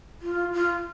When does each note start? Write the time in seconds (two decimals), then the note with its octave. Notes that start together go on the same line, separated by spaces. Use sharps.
0.22 F4
0.53 F4